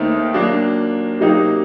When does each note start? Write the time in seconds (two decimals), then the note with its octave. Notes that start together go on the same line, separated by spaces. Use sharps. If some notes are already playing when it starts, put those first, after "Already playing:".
Already playing: D#2 D#3 A3 C4 D#4
0.34 F#3 A#3 D4
1.20 C3 F#3 A#3 D#4 G4